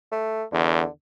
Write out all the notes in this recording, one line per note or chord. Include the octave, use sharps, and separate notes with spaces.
A3
E2 D3